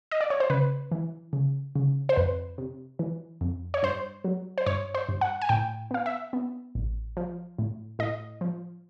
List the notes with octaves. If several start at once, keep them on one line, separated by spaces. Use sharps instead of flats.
D#5
D5
C#5
C5
C#3 B4
E3
C#3
C#3
C5
F2 B4
C3
E3
F2
C#5
G2 C5
F#3
C5
G2 C#5
C5
G2
F#5
G#5
A2 G5
B3 F5
E5
B3
A1
F3
A2
A2 D#5
F3